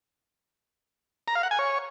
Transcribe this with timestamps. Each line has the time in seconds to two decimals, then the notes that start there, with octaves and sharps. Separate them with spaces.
1.28 A#5
1.35 F5
1.43 F#5
1.51 G#5
1.59 C#5